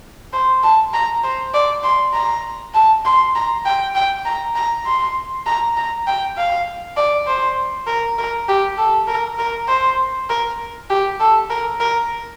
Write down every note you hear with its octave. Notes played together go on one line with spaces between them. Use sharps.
C5
A5
A#5
C5
D5
C6
A#5
A5
C6
A#5
G5
G5
A#5
A#5
C6
A#5
A#5
G5
F5
D5
C5
A#4
A#4
G4
A4
A#4
A#4
C5
A#4
G4
A4
A#4
A#4